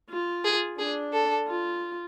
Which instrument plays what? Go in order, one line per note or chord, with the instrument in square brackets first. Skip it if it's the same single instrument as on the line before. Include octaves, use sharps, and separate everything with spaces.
[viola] F4
[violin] G#4
[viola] D4 [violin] G#4
[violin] A4
[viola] F4